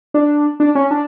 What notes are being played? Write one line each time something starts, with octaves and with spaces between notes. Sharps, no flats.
D4
D4
C#4
D4